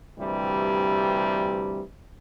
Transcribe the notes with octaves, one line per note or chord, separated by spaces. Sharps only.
D2 G2 C3 E3 G3